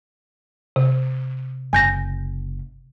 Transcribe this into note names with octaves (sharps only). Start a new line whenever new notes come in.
C3
F#1 G#5 G6 A#6